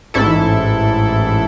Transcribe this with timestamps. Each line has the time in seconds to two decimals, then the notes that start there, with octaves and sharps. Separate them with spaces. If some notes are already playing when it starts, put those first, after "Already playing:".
0.14 A1 G#2 E4 A4